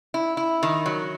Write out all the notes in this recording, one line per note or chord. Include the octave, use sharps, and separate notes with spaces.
E4
E4
D#3
F#3